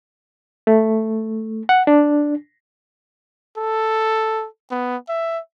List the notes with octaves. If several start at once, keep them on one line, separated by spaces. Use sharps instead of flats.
A3
F#5
D4
A4
B3
E5